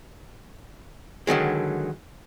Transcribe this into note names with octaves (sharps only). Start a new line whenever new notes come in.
D3 D#3 F#3 G#3